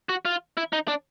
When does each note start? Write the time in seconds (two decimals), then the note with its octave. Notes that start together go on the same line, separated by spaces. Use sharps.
0.09 F#4
0.25 F4
0.57 E4
0.73 D#4
0.88 D4